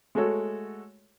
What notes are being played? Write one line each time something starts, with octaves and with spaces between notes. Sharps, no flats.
G#3 A3 F#4 A4 C#5